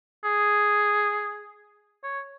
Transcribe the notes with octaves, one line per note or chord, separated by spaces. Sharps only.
G#4
C#5